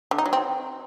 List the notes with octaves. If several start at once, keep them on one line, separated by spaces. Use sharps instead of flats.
D3
D#4
F#3
C4